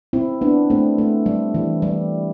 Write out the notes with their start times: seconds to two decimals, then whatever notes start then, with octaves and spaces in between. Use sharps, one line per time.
0.13 C4 E4
0.41 B3 D4
0.70 A3 C4
0.98 A3
1.26 G3
1.54 E3
1.82 G3